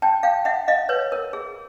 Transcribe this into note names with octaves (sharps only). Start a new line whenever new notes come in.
G5 A5
F5 G5
E5 F#5
D#5 F5
B4 C#5
A#4
G#4